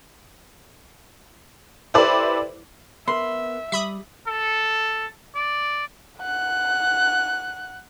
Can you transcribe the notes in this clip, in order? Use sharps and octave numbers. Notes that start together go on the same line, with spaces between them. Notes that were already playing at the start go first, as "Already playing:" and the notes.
E4 G4 A4 B4 C5 D5
B3 A#4 E5 B5 C6
G3 E5 B5 D#6
A4
D5
F#5 F#6